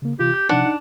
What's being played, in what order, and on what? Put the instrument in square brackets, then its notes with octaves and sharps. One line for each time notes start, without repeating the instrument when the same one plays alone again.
[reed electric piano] C#3 A#3
[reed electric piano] C3 E3 F4 [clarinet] G4
[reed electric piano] G6
[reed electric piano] C3 F3 D#4 [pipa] D4 [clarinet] F#5
[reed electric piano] D#4